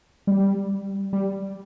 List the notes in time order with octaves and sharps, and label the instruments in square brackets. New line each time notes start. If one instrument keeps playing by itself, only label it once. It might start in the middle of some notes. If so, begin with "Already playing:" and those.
[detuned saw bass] G3
G3